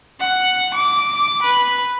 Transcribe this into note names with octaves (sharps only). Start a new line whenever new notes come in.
F#5
D6
B4